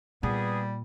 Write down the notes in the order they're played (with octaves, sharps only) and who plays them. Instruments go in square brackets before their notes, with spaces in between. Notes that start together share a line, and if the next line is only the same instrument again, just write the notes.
[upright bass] A#2 [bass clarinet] G3 [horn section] B3 G#4